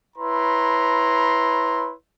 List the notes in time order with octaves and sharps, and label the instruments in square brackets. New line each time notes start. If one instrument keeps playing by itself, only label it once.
[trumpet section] E4 B4 C#5 A#5 C6